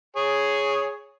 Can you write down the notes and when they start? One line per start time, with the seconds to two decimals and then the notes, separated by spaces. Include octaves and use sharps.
0.16 G#4 C#5